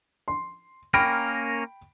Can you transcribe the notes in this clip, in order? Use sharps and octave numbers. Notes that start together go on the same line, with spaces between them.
C6
A#3 C#4 A#4 G5 B5 D7